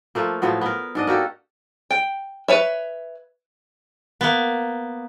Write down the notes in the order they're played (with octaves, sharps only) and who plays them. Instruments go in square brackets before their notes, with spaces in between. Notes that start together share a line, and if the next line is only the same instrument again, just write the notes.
[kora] F3 A3 A#3
A2 F3 F#3 B3
B3 A#4
G#2 D4 D#5
A#3 F#4 G4 A4
[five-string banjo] G5
B4 C#5 E5
[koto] A#3 B3